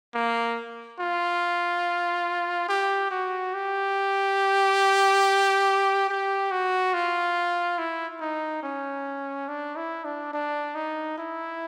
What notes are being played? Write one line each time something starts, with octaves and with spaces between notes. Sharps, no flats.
A#3
F4
G4
F#4
G4
G4
F#4
F4
E4
D#4
C#4
D4
E4
D4
D4
D#4
E4